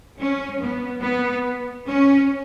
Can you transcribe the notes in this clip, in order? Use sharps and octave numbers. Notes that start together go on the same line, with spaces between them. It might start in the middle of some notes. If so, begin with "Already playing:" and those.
C#4
B3
B3
C#4